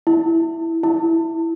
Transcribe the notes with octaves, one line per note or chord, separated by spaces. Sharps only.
E4
E4